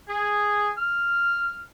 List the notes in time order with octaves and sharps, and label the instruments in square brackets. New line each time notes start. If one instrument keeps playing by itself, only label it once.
[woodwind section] G#4
F6